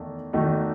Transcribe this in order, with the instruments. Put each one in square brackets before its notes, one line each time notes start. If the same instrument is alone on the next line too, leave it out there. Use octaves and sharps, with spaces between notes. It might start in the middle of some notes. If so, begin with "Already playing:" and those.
Already playing: [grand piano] E2 D#3 A3
E2 D#3 A3 D#4 F#4